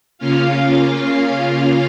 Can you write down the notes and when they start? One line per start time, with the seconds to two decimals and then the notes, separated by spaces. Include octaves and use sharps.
0.18 C#3 A#3 C#4 F4 F5
0.55 F5
1.29 F5